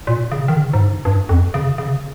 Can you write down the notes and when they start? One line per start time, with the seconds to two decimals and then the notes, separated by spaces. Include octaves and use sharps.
0.07 A#2
0.32 C#3
0.48 D#3
0.56 C#3
0.73 G#2
0.81 G2
1.05 G2
1.29 F2
1.54 C#3
1.78 C#3